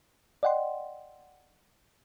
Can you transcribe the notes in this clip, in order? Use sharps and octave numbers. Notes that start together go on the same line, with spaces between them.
D5 D#5 F#5 G5 C6